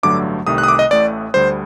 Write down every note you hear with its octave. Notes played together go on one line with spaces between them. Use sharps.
A1 G2 D3 F#3 A3 D6
C2 C3 D#3 A3 D#6
F#6
D#6
D6
D#5
A1 A2 A3 D5
D2 D3 G3 C5